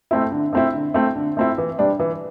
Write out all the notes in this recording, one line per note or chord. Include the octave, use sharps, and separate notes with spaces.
A3 C4 E4
D3
A3 C4 E4
D3
A3 C4 E4
D3
A3 C4 E4
E3
G3 D4
E3